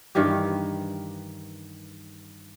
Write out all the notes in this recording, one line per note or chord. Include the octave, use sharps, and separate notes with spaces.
G2 D#3 E3 G4